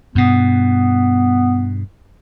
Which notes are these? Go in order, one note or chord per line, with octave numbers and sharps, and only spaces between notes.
G2 B2 B3